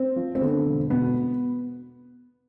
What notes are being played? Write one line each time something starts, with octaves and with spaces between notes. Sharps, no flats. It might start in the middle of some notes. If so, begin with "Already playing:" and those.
Already playing: C4
F3
C4
D3 B3
E1
B2 B3